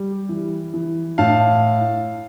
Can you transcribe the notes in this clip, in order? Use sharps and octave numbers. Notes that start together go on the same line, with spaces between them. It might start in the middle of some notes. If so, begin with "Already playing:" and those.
Already playing: G3
E3
E3
A2 F5 A5